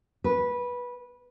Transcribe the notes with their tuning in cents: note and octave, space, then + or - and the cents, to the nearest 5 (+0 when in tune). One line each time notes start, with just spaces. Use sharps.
B4 -15